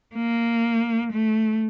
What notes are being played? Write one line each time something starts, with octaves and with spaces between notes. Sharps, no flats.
A#3
A3